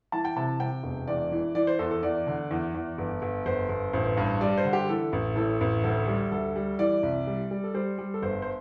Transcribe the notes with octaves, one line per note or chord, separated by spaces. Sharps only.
E3 A5
G5
C3 A5
C3 G5
E1
E2 D5
E3
E3 D5
C5
E2 A4
A4
E2 D5
D3
E2
E2
G1
G1
G1 C5
G1
A1 C5
G2
G3 D5
C5
D3
G4
E3 A4
A1
A2 A4
A1
D2 A4
G3
D2 A4
G3
E3 D5
C2
G3
G3
A4
G3 C5
G3
A4
G1 C5
C5